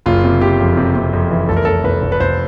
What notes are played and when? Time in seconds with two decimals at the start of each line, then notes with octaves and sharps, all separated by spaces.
0.06 F#1 F4
0.24 C3
0.41 C3 G4
0.60 F2
0.77 C3
0.95 C3
1.13 F2
1.31 E3
1.49 F1 A4
1.57 A#4
1.65 F1 A4
1.84 F1 B4
2.03 F1
2.12 B4
2.20 F1 C5